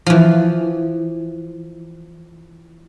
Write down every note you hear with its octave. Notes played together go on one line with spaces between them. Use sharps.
E3 F3